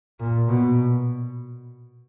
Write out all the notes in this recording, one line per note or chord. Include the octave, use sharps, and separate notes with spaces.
A#2
B2